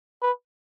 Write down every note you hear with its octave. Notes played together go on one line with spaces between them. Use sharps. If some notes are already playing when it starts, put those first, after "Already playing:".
B4